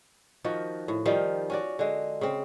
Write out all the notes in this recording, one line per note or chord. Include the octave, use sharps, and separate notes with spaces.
D#3 F3 F#4
A2
D#3 F3 G3 F5
C#4 F#4 D5
D3 G#3
C#3 C4